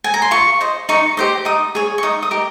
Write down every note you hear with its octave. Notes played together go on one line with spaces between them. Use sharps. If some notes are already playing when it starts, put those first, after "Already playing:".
G#5
A#5
C6
F4 C#6
C5 D#5
D#4 C#6
G4 C5 D#5
D#4 D#6
G#4 C#5
C#6
D#4 D#6
D#6
G4 A#4 D#5